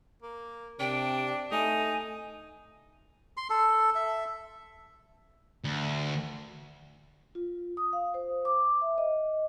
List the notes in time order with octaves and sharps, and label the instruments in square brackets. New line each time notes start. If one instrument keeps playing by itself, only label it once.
[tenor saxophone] A#3
[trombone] C3 [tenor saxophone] D4 [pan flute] G5
[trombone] A3 [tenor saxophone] D#4 [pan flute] G#5
[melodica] C6
A4
E5
[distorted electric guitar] D2
[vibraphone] F4
D#6
F5
C5
D6
E5
D#5